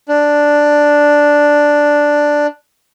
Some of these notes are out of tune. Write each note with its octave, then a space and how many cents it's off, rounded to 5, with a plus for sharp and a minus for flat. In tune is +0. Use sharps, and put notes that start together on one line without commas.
D4 +0